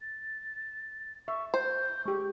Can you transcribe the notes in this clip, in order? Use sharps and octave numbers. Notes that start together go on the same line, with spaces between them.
A6
E5 C#6
C5 G6
G#3 G4 C#6